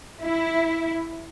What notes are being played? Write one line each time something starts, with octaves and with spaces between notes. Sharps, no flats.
E4